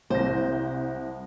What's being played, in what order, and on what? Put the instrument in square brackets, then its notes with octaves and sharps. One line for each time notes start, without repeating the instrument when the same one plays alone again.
[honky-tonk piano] C2 A#6 [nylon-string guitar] C5